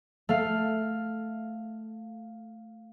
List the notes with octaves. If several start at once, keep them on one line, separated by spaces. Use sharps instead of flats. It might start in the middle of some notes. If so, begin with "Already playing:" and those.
A3 F5